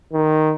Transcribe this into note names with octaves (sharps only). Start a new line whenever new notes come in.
D#3